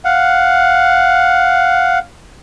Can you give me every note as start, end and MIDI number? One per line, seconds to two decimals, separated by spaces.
0.05 1.99 77
0.05 1.99 78